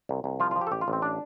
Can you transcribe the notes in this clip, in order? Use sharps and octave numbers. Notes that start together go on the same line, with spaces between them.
C2
C2
F3 F4
F4
F3
G4
A4
A1 G4
F4
A1 C4
D4